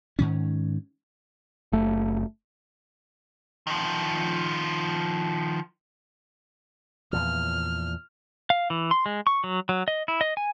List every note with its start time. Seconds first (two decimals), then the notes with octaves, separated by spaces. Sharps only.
0.19 G#2 D#3 C#4
1.72 F#1 A3
3.67 D#3 F3
7.13 E2 A#2 F3 F6
8.50 F5
8.70 E3
8.91 C6
9.06 G#3
9.27 C#6
9.44 F#3
9.69 F#3
9.88 D#5
10.08 E4
10.21 D#5
10.37 G#5